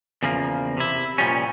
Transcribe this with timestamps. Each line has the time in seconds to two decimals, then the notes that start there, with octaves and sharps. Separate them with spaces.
0.23 E2 C#3 F3 A#3
0.77 C3 E4
1.18 C2 A#2 F3 G3 C#4